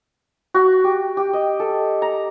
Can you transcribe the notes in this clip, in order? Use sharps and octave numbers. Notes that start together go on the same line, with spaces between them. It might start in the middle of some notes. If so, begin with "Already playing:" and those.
F#4
G4
G4
D#5
A4
A#5